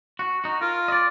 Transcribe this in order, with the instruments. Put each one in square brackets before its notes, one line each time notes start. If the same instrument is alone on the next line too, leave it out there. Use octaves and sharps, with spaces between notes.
[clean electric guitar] F#4
D#4 F#4
[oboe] F4 [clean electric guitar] A#4
[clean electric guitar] D5 D#5